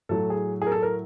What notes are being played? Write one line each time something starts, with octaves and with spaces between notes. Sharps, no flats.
A2 F#3 A4
G#4
G#4 A#4
A4
A#4